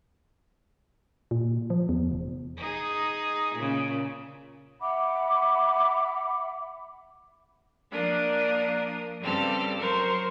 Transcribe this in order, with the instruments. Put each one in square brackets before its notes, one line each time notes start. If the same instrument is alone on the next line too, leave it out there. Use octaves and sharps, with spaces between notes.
[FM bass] A#2
F3
E2
F1
[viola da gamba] D#4 G#4
A#2 C#3
[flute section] E5 F#5 B5 D6
[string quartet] F3 A#3 D4 A#4 D#6
G2 C#3 G3 C4 A4 F6
F#3 A#4 C5 C#6